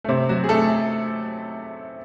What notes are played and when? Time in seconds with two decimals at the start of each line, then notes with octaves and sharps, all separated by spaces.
0.04 A3
0.09 C3 C4
0.29 F#3 F#4
0.44 G#4
0.49 A3 A4